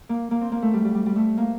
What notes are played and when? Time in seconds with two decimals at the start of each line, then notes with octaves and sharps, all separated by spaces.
0.09 A#3
0.31 A#3
0.41 C4
0.52 A#3
0.62 A3
0.73 G3
0.85 G3
0.95 G3
1.06 G3
1.16 A3
1.37 A#3